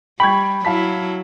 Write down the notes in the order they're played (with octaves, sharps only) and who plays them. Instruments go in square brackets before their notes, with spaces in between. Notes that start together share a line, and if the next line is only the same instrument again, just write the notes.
[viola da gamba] G3 [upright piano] G5 C#6 G#6 [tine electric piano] B5
[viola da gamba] F#3 E4 [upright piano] F5 A5 B6